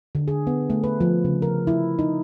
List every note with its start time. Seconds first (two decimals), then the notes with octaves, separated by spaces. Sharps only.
0.15 D3
0.28 G#4
0.47 B3
0.70 A3
0.84 B4
1.01 F3
1.24 C#3
1.42 A#4
1.67 E4
1.99 D#4